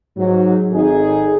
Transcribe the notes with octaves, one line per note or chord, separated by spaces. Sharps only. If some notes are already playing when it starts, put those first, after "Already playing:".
G#2 F#3
G#1 D#4 G#4 A4